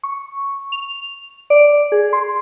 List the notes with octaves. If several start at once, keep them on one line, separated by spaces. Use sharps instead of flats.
C#6
F7
D5
G#4
C6